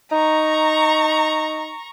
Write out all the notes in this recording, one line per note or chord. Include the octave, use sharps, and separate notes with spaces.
D#4 A#5 C#6